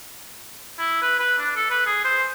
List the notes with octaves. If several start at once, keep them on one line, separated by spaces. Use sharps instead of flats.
E4
B4
B4
D4
A4
B4
G#4
C5